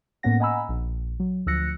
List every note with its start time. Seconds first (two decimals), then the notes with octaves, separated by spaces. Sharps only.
0.23 A2 A#3 B3 C#4 F#5 A#6
0.40 D#5 F#5 G#5 A#5 B5 E6
0.69 A#1
1.20 F#3
1.46 D2 F3 E6 F#6 A#6 C#7